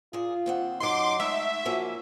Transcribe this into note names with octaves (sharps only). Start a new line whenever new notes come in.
A#2 F4 G#4
D#2 C4 F#5
F#2 F#3 D#4 C6 D6
G#3 A3 D#4 C#5 E5
F3 A#3 C#4 F#4